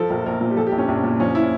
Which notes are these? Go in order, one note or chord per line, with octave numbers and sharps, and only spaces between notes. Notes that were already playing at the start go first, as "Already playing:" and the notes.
Already playing: F3 A4
A#1 A#4
A#1 A#4
A#2
G4
F3 A4
G4
A#1
C#4
A#1 D4
A#2
F3 C#4
E4